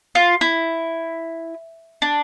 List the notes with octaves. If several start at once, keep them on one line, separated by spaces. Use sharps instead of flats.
F4
E4
D4